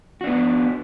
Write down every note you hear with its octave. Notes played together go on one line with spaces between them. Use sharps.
B3 D4 F#4